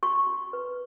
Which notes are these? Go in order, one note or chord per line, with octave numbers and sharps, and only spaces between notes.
F#4 C#6
F#4
B4